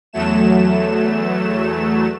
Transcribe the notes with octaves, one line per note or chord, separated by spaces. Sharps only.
E2 F#3 A3 E7